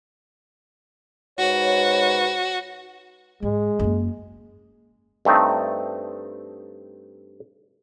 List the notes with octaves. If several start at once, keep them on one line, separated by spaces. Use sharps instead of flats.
G#2 F#4 B4 C#5
G#2 G#3
F#2 A#3
G2 A3 C4 D#4